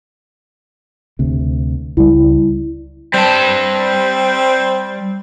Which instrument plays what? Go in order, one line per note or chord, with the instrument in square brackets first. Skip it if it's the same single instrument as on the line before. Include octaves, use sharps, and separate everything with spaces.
[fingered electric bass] D2 C3
[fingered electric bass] C#2 G3 [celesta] E4
[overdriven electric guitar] G3 A5 [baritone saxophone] C4